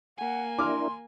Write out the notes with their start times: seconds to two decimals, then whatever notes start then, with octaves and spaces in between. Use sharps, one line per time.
0.18 A#3 F#5 G#5
0.59 D4 E4 A#4 C6 D6 F6